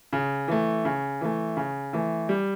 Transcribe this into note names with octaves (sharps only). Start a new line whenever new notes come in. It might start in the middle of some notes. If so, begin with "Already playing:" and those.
C#3
E3 A3
C#3
E3 A3
C#3
E3 A3
G3